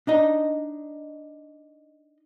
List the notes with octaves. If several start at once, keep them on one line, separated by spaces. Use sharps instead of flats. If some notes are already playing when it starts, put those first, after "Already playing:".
D4 D#4 D#5